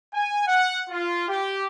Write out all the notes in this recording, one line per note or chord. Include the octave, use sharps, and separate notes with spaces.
G#5
F#5
F4
G4